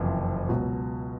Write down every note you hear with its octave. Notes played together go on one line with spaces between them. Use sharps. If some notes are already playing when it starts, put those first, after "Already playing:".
Already playing: F#1 F2 C3 E3
C#2 B2 F#3